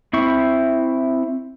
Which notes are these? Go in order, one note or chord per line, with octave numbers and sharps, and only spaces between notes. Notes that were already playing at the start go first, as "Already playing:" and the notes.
C4 E4 C#6